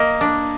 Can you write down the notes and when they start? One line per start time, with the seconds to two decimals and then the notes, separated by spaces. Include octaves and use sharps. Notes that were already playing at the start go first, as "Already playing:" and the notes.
Already playing: A#3 D#5
0.21 D4